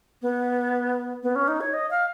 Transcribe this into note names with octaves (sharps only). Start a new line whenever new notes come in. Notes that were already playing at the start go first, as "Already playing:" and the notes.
B3
B3
C#4
D#4
C#5
D#5
F5